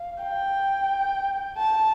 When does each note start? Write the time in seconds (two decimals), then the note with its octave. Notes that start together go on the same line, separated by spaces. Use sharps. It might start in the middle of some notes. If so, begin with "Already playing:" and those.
Already playing: F5
0.23 G5
1.58 A5